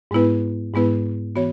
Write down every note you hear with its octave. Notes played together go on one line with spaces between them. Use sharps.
G#2 G#3 B3 E4 B4
G#2 G#3 B3 E4 B4
E3 B3 F#4 C#5